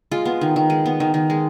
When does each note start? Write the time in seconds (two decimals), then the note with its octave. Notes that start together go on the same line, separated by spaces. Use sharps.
0.11 G#3 F4
0.25 B3
0.41 D#3
0.56 D#3
0.70 G#3
0.86 B3
1.00 D#3
1.14 D#3
1.30 G#3